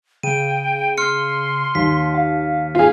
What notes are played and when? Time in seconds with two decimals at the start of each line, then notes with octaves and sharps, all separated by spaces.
0.23 C#3 G5 D#7
0.98 C6 F6 C#7
1.75 D#2 B6
2.14 F5
2.75 G#2 F4 G#4 F5